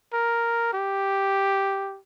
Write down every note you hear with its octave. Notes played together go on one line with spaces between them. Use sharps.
A#4
G4